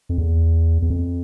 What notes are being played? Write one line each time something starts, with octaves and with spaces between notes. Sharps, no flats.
F2
E2
E2
F2